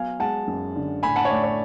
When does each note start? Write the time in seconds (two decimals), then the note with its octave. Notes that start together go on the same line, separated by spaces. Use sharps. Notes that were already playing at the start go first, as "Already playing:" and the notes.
Already playing: F#3 B3 F5 G#5
0.20 G#3 F#5 A5
0.47 F#2
0.76 D3
1.03 A2 G#5 B5
1.16 F#5 A5
1.25 C#5
1.30 A3 D5
1.44 C#5